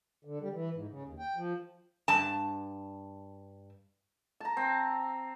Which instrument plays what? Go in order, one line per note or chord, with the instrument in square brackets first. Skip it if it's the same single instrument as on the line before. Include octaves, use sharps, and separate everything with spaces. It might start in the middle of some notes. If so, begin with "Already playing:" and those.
[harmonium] D3
G3
E3
G#2
C#3
D#2
G5
F3
[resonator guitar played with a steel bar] G2 A5
[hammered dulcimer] A5 A#5
C4